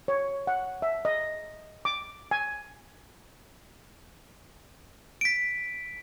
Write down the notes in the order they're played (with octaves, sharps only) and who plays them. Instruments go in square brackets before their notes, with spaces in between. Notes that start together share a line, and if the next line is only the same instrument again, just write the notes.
[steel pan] C#5
F#5
E5
D#5
D6
G#5
[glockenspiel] B6 D7